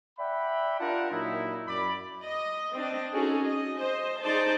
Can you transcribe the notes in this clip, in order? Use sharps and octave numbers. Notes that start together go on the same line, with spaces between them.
D5 E5 F#5 G5 B5
D4 F4 G4 A#4 F#5 A5
A#2 F#3 D#4 E4
F#2 D5 B5
D#5
C4 D4 D#5
C#4 D#4 F#4 G#4 A4
D#5
C5 D#5
D#4 G#4 C5 D5 A5